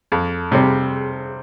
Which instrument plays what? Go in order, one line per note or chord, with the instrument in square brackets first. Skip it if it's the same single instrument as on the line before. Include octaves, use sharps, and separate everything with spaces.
[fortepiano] F2
C3 G3 C4